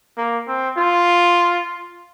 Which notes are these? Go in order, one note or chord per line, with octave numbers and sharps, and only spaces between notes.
A#3
C4
F4